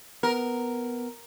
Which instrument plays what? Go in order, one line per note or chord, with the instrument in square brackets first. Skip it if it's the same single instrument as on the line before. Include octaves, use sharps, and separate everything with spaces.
[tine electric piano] B3 [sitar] A#4